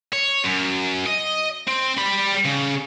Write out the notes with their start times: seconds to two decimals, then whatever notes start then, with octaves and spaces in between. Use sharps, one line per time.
0.13 C#5
0.44 F#2
1.06 D#5
1.68 C4
1.98 G3 B5
2.45 C#3